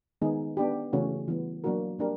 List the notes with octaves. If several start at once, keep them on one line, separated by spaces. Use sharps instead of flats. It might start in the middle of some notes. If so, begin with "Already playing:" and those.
D#3 G#3 B3 D#4 G#4
B3 D4 G4
C#3 E3 A3 C#4 F#4
E3 G3 B3
F#3 A#3 D4 F#4 A#4
G3 A#3 D4 G4 A#4